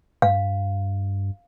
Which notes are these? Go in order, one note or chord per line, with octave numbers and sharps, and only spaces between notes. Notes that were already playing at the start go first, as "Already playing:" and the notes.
G2 F5